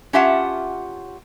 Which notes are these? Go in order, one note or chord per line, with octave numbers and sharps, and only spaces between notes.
C#4 F4 G4 E5 F#5 A5